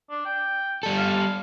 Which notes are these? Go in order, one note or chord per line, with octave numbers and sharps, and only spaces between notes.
D4
G5
G3 A4
F5